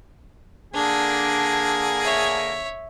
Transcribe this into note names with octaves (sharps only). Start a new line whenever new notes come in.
D3 A#3 D4 G#4
C#5 E5